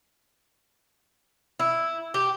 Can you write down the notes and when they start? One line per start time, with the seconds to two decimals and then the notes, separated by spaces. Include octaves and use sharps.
1.60 E4
2.14 G4